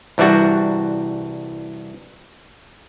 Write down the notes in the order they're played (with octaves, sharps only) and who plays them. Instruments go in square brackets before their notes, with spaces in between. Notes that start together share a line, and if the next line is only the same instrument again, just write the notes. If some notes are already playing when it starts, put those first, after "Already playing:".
[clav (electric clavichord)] C2 E3 G3 D4 F#4